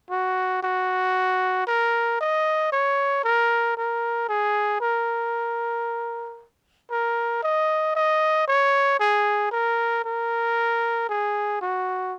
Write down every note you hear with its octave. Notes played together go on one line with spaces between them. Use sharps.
F#4
F#4
A#4
D#5
C#5
A#4
A#4
G#4
A#4
A#4
D#5
D#5
C#5
G#4
A#4
A#4
G#4
F#4